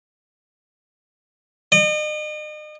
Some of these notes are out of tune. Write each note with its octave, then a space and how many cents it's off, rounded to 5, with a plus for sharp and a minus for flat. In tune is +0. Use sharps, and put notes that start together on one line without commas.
D#5 -40